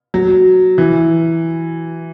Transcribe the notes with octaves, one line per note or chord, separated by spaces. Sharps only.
F#3
E3